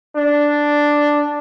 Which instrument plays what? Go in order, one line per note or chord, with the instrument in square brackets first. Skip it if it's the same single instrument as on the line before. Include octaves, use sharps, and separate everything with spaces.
[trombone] D4